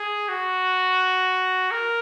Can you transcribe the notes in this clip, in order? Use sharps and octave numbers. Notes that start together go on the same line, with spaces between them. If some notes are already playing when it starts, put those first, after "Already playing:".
Already playing: G#4
F#4
A#4